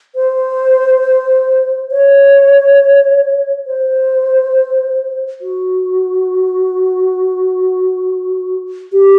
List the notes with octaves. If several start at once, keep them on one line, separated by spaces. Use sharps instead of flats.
C5
C#5
C5
F#4
G4